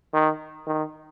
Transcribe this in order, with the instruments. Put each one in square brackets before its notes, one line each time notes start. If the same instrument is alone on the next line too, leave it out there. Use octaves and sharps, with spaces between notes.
[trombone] D#3
D#3